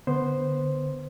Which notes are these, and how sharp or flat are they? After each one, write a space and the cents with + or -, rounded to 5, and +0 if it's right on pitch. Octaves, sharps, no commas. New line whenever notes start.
D3 +0 B3 +0 C5 +0